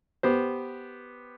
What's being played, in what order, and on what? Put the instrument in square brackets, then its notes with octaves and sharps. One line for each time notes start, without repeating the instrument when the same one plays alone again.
[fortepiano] B3 G4 C5